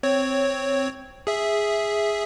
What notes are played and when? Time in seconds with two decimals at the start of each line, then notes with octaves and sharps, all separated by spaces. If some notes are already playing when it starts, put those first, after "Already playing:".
0.03 C4 C#5
1.27 G#4 E5